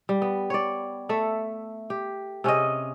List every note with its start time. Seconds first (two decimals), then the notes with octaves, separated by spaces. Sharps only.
0.09 G3
0.22 B3
0.50 C#5 D5
1.09 A3 A4 E5
1.90 G4
2.44 C3 C#4 G#4 D#5